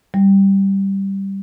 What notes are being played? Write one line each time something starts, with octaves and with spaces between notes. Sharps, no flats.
G3